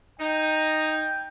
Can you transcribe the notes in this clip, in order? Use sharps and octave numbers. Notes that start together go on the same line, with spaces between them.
D#4 G5